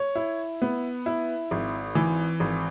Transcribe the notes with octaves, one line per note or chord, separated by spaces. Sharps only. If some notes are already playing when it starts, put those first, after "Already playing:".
Already playing: C#5
E4
B3
E4
G#1
E3
G#1